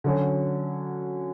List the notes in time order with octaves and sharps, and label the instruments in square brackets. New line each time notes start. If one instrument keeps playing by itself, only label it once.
[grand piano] D3 F#3 C#4 F#4